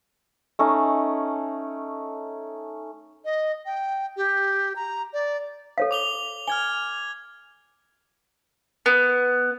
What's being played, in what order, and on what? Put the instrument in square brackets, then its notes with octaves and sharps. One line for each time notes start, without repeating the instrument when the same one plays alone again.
[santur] A3 C#4 D#4
[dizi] D#5
G5
G4
A#5
D5
[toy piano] A4 C#5 F5
[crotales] D6 F7 G7
[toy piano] G#5 [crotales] F6 G#6 G7
[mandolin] B3